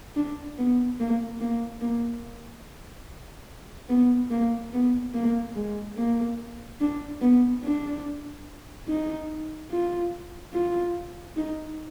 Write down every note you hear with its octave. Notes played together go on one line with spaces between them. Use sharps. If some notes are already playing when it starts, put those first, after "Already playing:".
D4
B3
A#3
A#3
A#3
B3
A#3
B3
A#3
G#3
A#3
D4
B3
D4
D#4
F4
F4
D#4